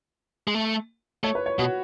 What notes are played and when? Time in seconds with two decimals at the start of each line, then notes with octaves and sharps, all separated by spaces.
0.47 G#3
0.55 A3
1.24 A3 C#5
1.35 B4
1.46 C#5
1.58 B2 F#4